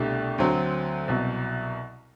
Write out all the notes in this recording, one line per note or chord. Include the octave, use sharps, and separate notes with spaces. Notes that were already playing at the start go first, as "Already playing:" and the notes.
Already playing: C2 B2 A3 D4 G4
D2 D3 F#3 C4
C2 B2 F#3